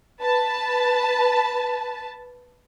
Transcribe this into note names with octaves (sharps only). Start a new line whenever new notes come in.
B4 A5